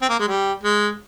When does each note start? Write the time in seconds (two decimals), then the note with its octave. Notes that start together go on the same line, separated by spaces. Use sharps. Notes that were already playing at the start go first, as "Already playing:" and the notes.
0.02 C4
0.09 A#3
0.19 G#3
0.28 G3
0.63 G#3